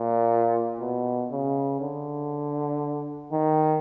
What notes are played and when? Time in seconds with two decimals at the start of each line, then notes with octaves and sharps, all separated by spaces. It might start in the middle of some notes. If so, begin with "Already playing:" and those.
Already playing: A#2
0.80 B2
1.31 C#3
1.81 D3
3.32 D#3